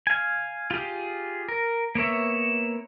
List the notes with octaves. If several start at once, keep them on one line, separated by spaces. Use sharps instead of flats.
F5 G#5
F4 G4 G#4
A#4
A#3 B3 C#5 E5